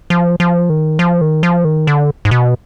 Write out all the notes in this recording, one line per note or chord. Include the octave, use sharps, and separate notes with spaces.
F3
F3
D#3
F3
D#3
F3
D#3
D3
G#2
B2